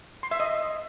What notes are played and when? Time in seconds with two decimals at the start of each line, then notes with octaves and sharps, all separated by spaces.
0.23 C6
0.31 E5
0.40 D#5